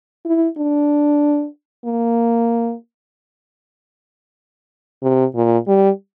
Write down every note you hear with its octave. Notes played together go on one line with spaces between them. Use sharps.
E4
D4
A#3
C3
A#2
G3